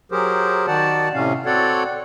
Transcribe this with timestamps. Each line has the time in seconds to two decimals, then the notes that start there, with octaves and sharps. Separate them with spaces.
0.12 F#3 G4 G#4 A#4 C5
0.67 D#3 F#4 D5 F#5 A5
1.14 A2 C3 C#4 F5
1.46 C4 F#4 A4 C#5 D5 F#5